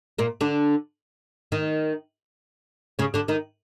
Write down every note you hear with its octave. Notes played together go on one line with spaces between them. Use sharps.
A#2 A#3
D3 D4
D#3 D#4
C#3 C#4
D3 D4
D#3 D#4